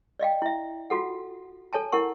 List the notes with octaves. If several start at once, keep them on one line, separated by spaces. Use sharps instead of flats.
D5 D#5 F5 G5
E4 E5
F4 F#4 A4 F#5
A4 C#5 G#5 A5
E4 A#4 F#5 C#6